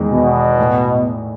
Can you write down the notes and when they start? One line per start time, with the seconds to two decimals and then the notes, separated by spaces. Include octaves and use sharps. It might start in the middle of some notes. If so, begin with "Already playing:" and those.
Already playing: E2 D#3 G#3
0.12 B2
0.58 A2